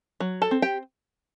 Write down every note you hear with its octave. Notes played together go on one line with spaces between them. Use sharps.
F#3
A4 A5
C4
G4 G5